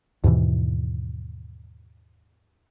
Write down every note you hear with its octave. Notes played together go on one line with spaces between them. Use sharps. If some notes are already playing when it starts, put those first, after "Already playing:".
D#2 G#2 B2 E3